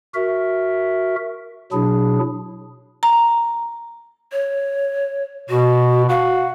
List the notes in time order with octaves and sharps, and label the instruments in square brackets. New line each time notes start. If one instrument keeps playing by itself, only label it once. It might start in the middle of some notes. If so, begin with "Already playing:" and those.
[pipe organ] F#4 A#4 E5
B2 F#3 D4 E4 G#4
[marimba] A#5
[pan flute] C#5
[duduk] B2 [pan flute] F#4
[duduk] F#4 [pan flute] F5